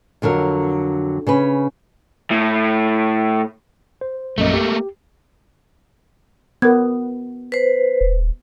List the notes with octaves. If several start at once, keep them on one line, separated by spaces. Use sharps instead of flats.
F2 D3 F#3 A#4
C#3 C#4 B4
A2
C5
A#1 F#2 A3 A#3 D#5
G4
B3 A#4 G#6
B4 C5
D#1